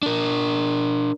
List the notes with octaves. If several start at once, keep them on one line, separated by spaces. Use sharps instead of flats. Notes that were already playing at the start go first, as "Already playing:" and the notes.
D4 A#4